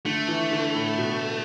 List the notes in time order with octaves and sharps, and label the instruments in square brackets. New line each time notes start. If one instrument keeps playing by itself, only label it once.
[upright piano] D3 [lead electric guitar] A3
[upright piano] E3
D3
A2
B2